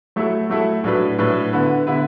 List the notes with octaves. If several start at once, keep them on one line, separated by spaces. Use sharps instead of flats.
F#3 A3 E4 A4
F#3 A3 E4 A4
A2 F#3 D4 B4
A2 F#3 D4 B4
D3 B3 E4 B4
D3 B3 E4 B4